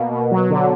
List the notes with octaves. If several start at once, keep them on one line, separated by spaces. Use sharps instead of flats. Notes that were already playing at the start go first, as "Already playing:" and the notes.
Already playing: B2 A#3
B2
F#3
D3